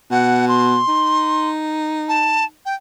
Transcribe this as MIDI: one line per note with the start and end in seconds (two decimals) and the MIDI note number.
0.11 0.81 47
0.11 0.45 78
0.48 1.49 84
0.88 2.54 63
2.08 2.45 81
2.65 2.74 79